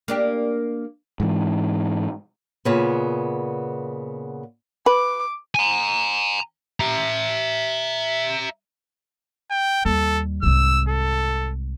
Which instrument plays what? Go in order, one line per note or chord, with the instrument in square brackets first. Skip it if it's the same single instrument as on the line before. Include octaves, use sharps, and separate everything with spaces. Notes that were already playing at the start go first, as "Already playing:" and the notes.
[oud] A#3 D4 G4
[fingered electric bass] G#2 E3
[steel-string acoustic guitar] A#2 C#3 B3
[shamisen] B4 [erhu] D6
[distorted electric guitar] G#5 A#5
E5 A#5
[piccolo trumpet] G5
[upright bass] D#2 G3 [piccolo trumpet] A4
[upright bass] C2 G#2 [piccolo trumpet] E6
[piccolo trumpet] A4